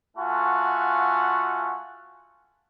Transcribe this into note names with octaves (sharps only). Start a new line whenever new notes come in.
A3 F4 F#4 F#5 G#5